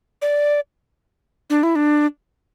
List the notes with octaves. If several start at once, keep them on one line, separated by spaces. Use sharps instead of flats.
D5
D4
E4
D4